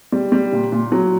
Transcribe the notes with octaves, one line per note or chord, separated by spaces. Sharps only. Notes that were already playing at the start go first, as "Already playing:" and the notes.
G3
G3
A#2
A#2
F#3